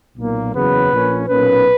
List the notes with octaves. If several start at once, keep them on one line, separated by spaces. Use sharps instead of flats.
B1 A#2 A#3
F#1 E2 C#3 F#3 B3 B4
A#1 A#2 A#3 C#4
B1 A#2 A#3 C#4 B4